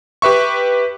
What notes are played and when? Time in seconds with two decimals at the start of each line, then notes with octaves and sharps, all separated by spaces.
0.22 G4 B4 E5 C#6